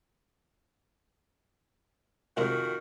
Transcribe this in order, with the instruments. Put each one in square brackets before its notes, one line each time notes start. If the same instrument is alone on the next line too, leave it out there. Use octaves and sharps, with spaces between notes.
[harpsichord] C2 G#3 A#4 [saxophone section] F2 D#3 F#4